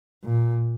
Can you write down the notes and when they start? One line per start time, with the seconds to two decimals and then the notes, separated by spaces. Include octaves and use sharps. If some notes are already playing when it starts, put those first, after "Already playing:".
0.24 A#2